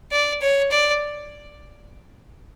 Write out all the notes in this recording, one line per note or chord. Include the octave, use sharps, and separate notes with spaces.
D5
C#5
D5